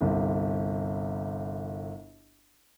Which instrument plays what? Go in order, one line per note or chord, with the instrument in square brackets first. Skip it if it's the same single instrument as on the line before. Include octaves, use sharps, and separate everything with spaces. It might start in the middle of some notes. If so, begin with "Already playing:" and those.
[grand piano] G1 C2